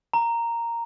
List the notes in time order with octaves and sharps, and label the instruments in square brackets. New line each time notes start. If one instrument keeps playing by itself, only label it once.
[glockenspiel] A#5